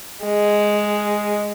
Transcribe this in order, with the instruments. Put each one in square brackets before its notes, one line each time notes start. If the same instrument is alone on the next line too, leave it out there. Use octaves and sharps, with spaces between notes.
[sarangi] G#3